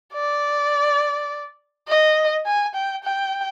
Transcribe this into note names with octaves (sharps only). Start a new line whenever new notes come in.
D5
D#5
G#5
G5
G5